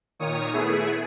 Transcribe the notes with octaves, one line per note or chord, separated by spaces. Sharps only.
A#2 D#3 C#5 D#6 D#7
A3 B3 E4 G#4